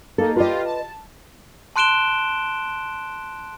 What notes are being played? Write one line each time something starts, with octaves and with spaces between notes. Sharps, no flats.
A#3 D#4 A4
F4 G4 B4 D#5
A5
A5 C6 F#6 D7 E7 G7